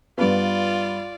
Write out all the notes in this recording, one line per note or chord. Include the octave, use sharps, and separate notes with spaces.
G2 B3 F4 D5